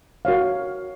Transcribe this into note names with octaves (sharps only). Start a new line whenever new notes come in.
F#4 A#4 C#5 F5